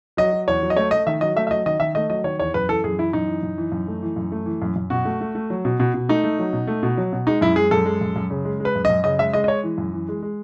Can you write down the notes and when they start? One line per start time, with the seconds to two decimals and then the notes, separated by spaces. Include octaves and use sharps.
0.17 F#3 D#5
0.32 F#3
0.48 E2 C#5
0.63 F#3
0.70 D#5
0.76 A3 C#5
0.91 A3 D#5
1.07 D#3 E5
1.21 F#3 D#5
1.36 A3 E5
1.47 E5
1.51 F#3 D#5
1.66 D#3 D#5
1.80 D#3 E5
1.95 A3 D#5
2.10 F#3 D#5
2.24 D#3 C#5
2.39 E2 C#5
2.54 F#2 B4
2.69 E3 A4
2.84 F#2 G#4
2.98 E3 E4
3.13 F#2 D#4
3.28 E3
3.43 F#2
3.58 E3
3.72 F#2
3.88 A3
4.02 E3
4.16 F#2
4.32 A3
4.46 E3
4.62 F#2
4.76 F#2
4.90 B2 F#4
5.05 A3
5.21 A3
5.35 A3
5.50 F#3
5.65 B2
5.80 B2
5.94 B2
6.09 A3 D#4
6.24 A3
6.39 F#3
6.53 B2
6.67 A3
6.83 B2
6.97 F#3
7.13 B2
7.27 G#3 D#4
7.41 F#2 E4
7.56 G#3 G#4
7.71 F#2 A4
7.86 G#3
8.01 F#2
8.16 F#2
8.30 C#3
8.45 G#3
8.60 G#3
8.65 B4
8.75 F#2
8.85 D#5
8.90 F#2
9.04 C#3 D#5
9.19 G#3 E5
9.33 G#3 D#5
9.44 D#5
9.48 G#3 C#5
9.63 E3
9.78 F#2
9.93 E3
10.08 G#3
10.22 G#3